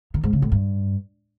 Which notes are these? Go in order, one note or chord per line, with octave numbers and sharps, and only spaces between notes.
D#3
G#2
C#3
A2
G2